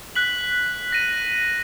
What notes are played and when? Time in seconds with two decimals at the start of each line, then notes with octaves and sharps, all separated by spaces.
0.15 F#6 B6 F#7
0.93 A#6 D#7